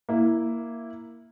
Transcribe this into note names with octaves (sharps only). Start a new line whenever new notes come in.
A#3 E4